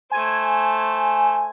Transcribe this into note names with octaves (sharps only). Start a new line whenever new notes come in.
A3 C5 G#5